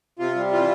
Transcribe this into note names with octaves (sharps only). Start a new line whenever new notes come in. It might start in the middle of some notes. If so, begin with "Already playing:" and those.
C3 F4
G3
E3 F4